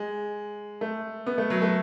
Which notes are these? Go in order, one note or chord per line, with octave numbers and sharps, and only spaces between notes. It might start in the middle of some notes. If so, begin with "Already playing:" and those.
Already playing: G#3
A3
B3
A3
F#3
A3